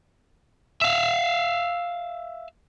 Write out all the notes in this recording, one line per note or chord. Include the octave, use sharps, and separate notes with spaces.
E5 F5